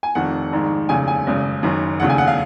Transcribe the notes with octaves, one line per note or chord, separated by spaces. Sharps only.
G#5
F1 F2 D#3 F#5
A#1 G#2 D#3
F1 D#2 C#3 G#5
G#5
G#1 F#2 C#3
F#1 F#2 D#3
F1 D#2 C#3 F#5
G#5
F#5
F5